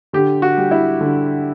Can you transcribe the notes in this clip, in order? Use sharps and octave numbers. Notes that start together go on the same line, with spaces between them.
D3 G4
F#4
G3
E4
D3